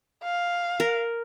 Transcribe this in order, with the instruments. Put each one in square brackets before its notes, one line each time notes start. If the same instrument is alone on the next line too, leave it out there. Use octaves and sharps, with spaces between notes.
[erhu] F5
[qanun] A#4